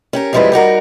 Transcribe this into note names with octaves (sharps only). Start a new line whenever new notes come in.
C#4 G4 A#4
F#2 F3 G3 G#3 E4 B4
G3 D#4 F#4 A#4